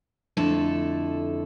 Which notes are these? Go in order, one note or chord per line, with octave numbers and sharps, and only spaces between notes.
F2 D3 A3 E4 A4 A5